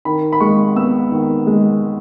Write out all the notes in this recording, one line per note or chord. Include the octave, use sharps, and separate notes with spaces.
D#3 B5
B5
G#3 C#6
B3 E6
D#3
G#3